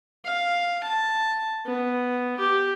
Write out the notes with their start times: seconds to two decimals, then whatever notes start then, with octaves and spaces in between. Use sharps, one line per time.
0.25 F5
0.83 A5
1.66 B3
2.38 G4